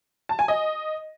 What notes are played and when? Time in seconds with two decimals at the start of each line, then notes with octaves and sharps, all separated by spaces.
0.29 A5
0.39 G#5
0.48 D#5